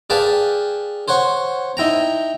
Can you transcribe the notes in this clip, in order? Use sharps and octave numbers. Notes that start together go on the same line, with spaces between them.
G#4 B4 D5 F5 G5 A5
C5 C#5 F#5 C#6
D#4 E4 G5 A#5